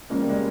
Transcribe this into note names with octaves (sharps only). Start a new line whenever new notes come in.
C#3 F3 G#3 A#3 C#4
G3
G#3